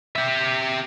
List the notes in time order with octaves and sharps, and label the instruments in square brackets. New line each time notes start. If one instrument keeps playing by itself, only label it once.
[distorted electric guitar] G4 E5